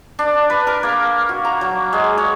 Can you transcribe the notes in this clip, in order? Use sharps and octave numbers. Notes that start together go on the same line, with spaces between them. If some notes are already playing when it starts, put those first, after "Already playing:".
D4
B4
A#4
A#3
F#4
A#5
F#3
G#3
C#5